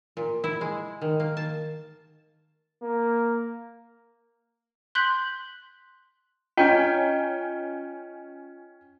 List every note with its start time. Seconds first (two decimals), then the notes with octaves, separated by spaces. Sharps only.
0.17 A#2
0.44 E4
0.61 G#3
1.02 D#3
1.20 A#3
1.37 A5
2.82 A#3
4.95 C6 F#6 G6 B6 F#7
6.57 C#4 F4 D#5 G5 G6